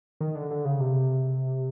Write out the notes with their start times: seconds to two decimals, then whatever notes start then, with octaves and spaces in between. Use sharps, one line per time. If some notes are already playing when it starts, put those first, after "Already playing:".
0.21 D#3
0.35 D3
0.51 D3
0.65 C#3
0.80 C3